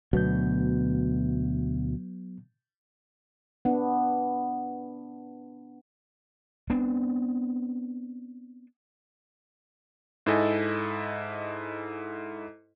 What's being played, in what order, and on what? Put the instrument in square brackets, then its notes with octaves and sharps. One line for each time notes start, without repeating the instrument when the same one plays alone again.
[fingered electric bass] D2 B2 [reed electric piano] F#3 B3 G6
[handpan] B3 D4
[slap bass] B3 C4 D4
[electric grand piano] G#2 E4 A4 D#5 G#5